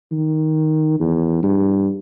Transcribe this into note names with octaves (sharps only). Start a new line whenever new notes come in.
D#3
E2
G2